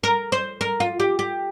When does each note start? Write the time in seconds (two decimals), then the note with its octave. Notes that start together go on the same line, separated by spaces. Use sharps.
0.03 A#4
0.32 C5
0.61 A#4
0.80 F4
1.00 G4
1.19 G4